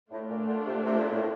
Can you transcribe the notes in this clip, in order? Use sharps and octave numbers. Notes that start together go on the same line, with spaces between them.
A2 A3 D4 F4
A#2
D3
C3
C3
A#2
A2